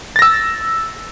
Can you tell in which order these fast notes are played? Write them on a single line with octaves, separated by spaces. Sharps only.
A6 A#6 E6